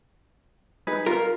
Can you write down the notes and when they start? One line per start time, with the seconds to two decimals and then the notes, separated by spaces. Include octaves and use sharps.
0.87 D#4 G#4 B4
1.06 F4 A#4